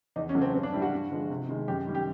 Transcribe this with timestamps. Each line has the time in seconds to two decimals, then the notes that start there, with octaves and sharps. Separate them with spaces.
0.16 E2 D#4
0.29 C#4
0.35 C#3 F#3 A3
0.42 C4
0.53 G2 C4
0.63 D4
0.72 E3 G3 E4
0.82 F#4
0.92 G2
1.10 D3 F3 G#3
1.30 C3
1.48 D#3 G#3
1.68 F#2 G4
1.87 D#3 G3
1.95 G4